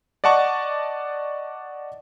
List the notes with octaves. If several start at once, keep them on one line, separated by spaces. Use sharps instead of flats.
D5 D#5 F#5 A5 C#6